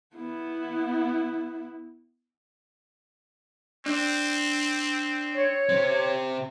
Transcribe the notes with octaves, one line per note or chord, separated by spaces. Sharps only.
B3 E4
C4 D4
C#5
C3 C4